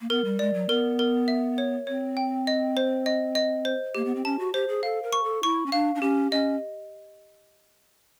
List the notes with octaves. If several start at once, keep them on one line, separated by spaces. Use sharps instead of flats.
A#3
B3 A#4
G3
G#3 D5
F#3
B3 A#4
A#4
E5
C#5
C4 C#5
G5
D#5
C5
D#5
D#5
C5
A#3 G4
B3
C4
C#4 A5
F#4
G4 C5
G#4
A4 F5
A#4
C#6
A4
E4 C#6
C#4
D4 F5
D4
C#4 G4
C#4 D#5